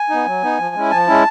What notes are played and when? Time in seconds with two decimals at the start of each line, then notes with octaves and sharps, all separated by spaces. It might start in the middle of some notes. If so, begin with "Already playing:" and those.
Already playing: G#5
0.10 B3 D#4
0.26 F#3
0.43 B3 D#4
0.59 F3
0.75 G#3 C#4 E4
0.91 F3 A5
1.08 G#3 C#4 E4